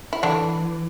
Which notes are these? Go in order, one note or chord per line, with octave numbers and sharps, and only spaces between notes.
E4
D3 E3 D4